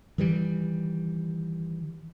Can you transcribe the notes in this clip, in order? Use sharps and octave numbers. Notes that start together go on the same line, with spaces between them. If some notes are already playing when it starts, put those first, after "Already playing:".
D#3 E3 G3